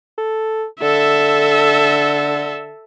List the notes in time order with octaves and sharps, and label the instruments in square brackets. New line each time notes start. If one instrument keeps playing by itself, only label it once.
[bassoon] A4
[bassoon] D3 [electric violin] A4 E5